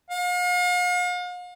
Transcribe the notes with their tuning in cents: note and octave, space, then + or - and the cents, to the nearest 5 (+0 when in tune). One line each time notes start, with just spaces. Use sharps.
F5 +45